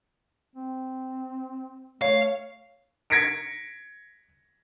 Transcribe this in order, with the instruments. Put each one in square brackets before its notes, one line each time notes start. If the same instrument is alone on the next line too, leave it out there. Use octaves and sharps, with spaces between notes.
[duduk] C4
[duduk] A3 [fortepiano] C#5 [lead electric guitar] F5
[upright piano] G#6 A#6 B6 C#7 D7